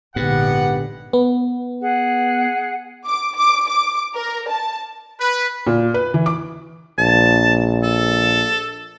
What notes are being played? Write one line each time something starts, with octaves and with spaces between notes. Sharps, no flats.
A#1 G#2 D3 B3 G4 F#5
B3
G#4 F#5
D6
D6
D6
A#4
A5
B4
A#2
B4
E3
D6
A#1 A5
A4